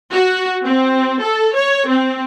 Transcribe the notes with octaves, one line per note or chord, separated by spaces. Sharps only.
F#4
C4
A4
C#5
C4